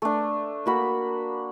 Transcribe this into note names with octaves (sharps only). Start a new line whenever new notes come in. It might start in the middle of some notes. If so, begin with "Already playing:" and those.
A3 D4
A#3 F#4 B5